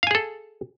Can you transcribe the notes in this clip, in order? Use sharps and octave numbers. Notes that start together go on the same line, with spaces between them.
G#4 A4 F5 G#5